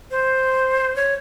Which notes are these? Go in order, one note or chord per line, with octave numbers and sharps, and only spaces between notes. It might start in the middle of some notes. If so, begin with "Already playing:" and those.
C5
C#5